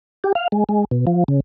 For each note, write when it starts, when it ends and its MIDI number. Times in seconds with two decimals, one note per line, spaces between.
0.24 0.33 67
0.35 0.48 77
0.52 0.64 56
0.69 0.85 56
0.91 1.05 47
1.07 1.24 53
1.28 1.40 49